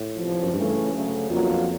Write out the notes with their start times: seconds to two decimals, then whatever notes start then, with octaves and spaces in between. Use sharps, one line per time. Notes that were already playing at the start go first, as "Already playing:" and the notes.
Already playing: A2
0.17 E2 C3 F3
0.43 F#2
0.54 G2 C#3 E3 A3 C#4
0.93 D2 C#3 F#3 A3
1.30 F2 B2 F#3 A#3 D4 F4
1.50 F2